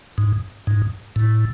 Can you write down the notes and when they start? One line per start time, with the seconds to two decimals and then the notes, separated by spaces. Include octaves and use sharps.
0.18 G#2
0.67 G#2
1.16 A2